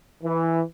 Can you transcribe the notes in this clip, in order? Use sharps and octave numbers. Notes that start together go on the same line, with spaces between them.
E3